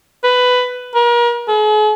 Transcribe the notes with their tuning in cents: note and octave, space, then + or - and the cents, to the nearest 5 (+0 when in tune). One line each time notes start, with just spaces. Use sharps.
B4 +10
A#4 +40
G#4 +45